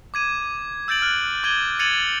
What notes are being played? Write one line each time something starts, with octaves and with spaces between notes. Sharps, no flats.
D6 G#6 D#7
E6 G6 A6 D7 F#7
F6 F#6
D6 G#6 D#7 G7
G#6 A6 C#7 D#7 F7 F#7